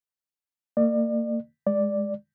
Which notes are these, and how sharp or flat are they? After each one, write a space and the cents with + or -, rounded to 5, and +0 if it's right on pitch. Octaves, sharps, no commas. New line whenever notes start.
A#3 -35 D5 +35
G#3 +0 D5 +0